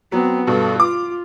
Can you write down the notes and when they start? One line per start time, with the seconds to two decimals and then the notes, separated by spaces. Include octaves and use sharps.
0.12 F#3 B3 C4
0.47 G2 B2 A4
0.80 F4 D6